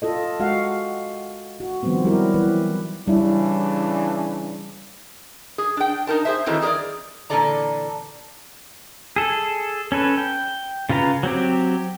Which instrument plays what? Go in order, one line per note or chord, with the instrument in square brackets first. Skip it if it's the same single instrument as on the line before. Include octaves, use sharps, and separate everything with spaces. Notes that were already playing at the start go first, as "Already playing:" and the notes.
[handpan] F4 A4 D#5
G#3 F#4 F5 F#5
F#4
D#3 F3 G3 B3 C4
F#3 G3 E4 G4 A#4
E3 B4
[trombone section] C#3 E3 D4 [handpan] G3 E4
[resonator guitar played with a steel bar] G#4
D4 G5
D#4 A#4 A5
G#4 C5 E5
D#3 E3 F#3 A3 C4
G#4 A#4 C5 D5
A#2 D3 E3 A4 D5 A#5
[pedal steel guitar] G#4 A4
C#4 A4 B4
G5
C#3 F4 B4 A#5
F#3 C4 G4